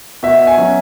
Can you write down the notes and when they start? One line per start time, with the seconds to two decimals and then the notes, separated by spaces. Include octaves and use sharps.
0.23 B2 E5
0.47 G#5
0.58 F#3 C#4